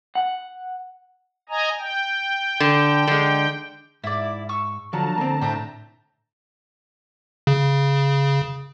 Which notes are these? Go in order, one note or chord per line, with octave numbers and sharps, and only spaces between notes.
F#5
D#5 G#5 A#5
G5
D3
D3 G#3
G#2 E4 D5
C#6 E6
D3 F3 F#3 A5 A#5
A#3 C4
A2 C4 E5 G5
C#3